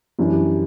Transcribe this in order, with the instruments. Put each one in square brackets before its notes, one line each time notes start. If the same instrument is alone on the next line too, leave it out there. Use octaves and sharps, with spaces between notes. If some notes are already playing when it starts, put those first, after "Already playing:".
[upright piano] F#2 E3 G3 D4